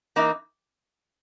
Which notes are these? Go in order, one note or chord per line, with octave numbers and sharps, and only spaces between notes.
E3 A#3 D#4